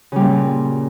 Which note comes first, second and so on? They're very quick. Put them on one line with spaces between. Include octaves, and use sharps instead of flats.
C#3 G3 A#2